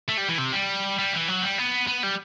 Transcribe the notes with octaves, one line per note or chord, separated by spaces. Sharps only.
A3
G3
E3
C3
G3
G3
E3
F#3
G3
B3
B3
G3